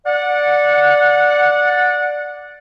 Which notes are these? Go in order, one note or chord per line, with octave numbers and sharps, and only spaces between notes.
D5 F#5